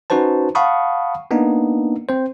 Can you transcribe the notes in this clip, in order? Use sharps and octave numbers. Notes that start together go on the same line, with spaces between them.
C#4 D#4 F#4 B4 C5 A5
F5 F#5 A5 B5 C#6 D#6
A#3 B3 D4 D#4
C4 C5